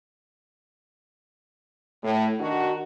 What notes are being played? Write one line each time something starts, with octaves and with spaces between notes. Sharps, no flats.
A2
D#3 D4 F#4